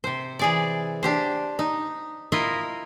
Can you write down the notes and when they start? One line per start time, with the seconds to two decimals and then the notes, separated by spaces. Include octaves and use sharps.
0.04 C3 C5
0.39 E3 G#4 D5
1.03 D4 G4 C5
1.59 D#4
2.32 E4 F4 A#4 D#5